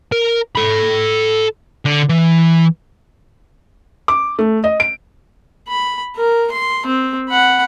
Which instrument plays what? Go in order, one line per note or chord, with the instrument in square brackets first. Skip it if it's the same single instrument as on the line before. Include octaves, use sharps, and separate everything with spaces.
[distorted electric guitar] A#4
A4 B5
D3
E3
[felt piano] D6
A3
D#5
D7
[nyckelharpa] B5
A#4
C6
C4
F#5 B5